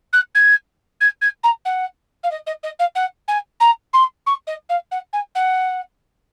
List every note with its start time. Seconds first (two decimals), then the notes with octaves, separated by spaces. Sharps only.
0.13 F#6
0.35 G#6
1.01 G#6
1.21 G#6
1.43 A#5
1.65 F#5
2.23 F5
2.31 D#5
2.47 D#5
2.63 D#5
2.79 F5
2.95 F#5
3.28 G#5
3.60 A#5
3.93 C6
4.27 C#6
4.47 D#5
4.69 F5
4.91 F#5
5.13 G#5
5.35 F#5